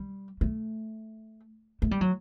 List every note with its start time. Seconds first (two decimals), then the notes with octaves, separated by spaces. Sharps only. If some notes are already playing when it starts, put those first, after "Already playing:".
Already playing: G3
0.41 A3
1.82 A3
1.91 G3
2.01 F#3